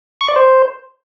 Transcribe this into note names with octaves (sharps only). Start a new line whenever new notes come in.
C#6
D5
C5